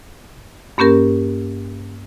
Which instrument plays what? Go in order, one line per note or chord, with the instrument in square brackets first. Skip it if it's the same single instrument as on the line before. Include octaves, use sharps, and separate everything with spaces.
[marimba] G2 A#3 C#4 G4 A#4